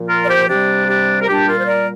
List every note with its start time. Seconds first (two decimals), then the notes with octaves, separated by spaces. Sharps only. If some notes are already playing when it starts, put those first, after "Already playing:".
Already playing: A#2 F3
0.08 F4 A#4
0.23 D5
0.29 G4 C5
0.48 C3 G3 D4 G4
0.88 D4 G4
1.22 A#4
1.27 A#2 G3 D4 G4
1.48 F4 A#4
1.59 C5
1.67 A#4 D5